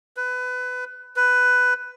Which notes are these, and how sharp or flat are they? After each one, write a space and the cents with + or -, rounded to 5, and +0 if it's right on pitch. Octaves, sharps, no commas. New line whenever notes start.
B4 +20
B4 +10